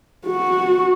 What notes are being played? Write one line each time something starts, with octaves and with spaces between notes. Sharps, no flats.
F#4